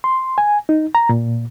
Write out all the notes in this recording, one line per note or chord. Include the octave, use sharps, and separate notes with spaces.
C6
G#5
D#4
A#5
A#2